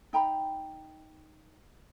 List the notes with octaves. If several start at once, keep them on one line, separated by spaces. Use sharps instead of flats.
D#4 G5 A#5 B5